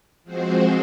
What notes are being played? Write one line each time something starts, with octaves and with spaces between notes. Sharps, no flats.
F3 G#3 C4 F#4 C5